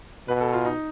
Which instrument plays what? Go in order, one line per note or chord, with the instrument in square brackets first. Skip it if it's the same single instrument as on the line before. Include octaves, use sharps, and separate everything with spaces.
[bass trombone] B2 [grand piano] B4
[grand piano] A4
F4
D#4